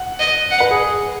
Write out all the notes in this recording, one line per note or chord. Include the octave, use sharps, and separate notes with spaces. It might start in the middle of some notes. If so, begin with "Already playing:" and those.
Already playing: F#5
D#5
F#5
B4
G#4